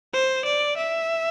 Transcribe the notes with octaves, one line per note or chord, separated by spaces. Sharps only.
C5
D5
E5